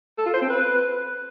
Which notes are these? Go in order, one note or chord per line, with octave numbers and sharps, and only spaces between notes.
A4
F4
C5
C4
B4